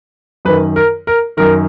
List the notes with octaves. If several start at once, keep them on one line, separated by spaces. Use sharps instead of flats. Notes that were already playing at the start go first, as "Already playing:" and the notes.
F#2 D#3 B4
A#4
A#4
F#2 D#3 A#4